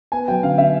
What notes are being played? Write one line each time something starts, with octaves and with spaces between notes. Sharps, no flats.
B3 G#5
F#3 G5
D3 F5
D3 E5